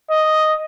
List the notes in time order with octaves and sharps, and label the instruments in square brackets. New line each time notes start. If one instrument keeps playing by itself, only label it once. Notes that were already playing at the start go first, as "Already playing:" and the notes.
[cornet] D#5